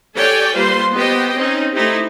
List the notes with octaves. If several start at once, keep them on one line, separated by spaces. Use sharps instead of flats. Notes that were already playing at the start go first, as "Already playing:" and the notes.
G4 A4 C#5 D5 G5 G#5
G3 A#3 F4 B4 C5 C6
B3 G4 C5 D#5 G5
C4 C#4 D#4
A3 C4 D#4 E4 G4